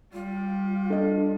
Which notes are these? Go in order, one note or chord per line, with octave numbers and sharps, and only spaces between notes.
G3 F4
D4 A4 D#5